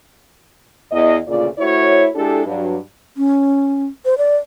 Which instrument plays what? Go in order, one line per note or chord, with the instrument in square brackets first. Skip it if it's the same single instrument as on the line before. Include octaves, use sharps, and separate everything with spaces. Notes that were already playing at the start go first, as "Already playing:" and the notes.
[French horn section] E2 D#5
D2 A#2 C#3 F4 D5
A3 E4 F#4 C5 C#5
G#3 D4 E4 G4 A4
G2 F#3 D4
[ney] C#4
C5
D5